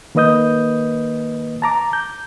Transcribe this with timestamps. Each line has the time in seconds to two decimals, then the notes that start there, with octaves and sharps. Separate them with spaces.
0.15 D#3 A#3 B4 D#5 D#6 G6
1.62 A5 A#5 D6
1.93 G6